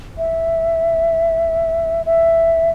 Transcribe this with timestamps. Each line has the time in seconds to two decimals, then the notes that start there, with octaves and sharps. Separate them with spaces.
0.18 E5
2.06 E5